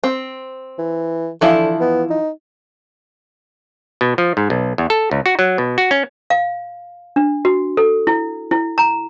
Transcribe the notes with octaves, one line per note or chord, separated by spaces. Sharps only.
C4
E3
D3 E3 F3 E4
B3
D#4
B2
F3
G#2
B1
E2
A4
C#2
F#4
F#3
B2
F#4
C#4
F5
D4
F#4
A4
E4
E4
A#5